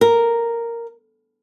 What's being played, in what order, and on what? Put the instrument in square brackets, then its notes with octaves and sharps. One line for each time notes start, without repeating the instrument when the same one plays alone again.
[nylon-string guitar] A#4